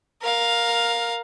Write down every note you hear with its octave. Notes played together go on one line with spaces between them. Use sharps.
A#4 F5